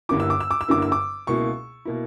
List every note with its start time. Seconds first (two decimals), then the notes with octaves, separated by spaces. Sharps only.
0.09 G1 G2 D3 A#3 E4 D6
0.20 E6
0.30 D6
0.40 E6
0.51 D6
0.61 E6
0.68 G1 G2 D3 A#3 E4 D6
0.82 E6
0.92 D6
1.27 C#2 B2 A#3 E4 C#6
1.85 B2 A#3 E4